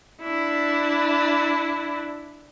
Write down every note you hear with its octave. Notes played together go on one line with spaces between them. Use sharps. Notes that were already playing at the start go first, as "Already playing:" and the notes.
D4 E4